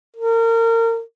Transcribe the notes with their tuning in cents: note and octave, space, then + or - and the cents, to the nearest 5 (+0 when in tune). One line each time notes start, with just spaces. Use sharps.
A#4 -30